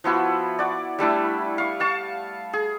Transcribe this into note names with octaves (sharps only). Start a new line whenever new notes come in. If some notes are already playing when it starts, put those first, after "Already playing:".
F3 B3 E4 F#4
F#4 D5
G3 A3 D4 E4
F5 C#6
F5 A5 C#6
G#4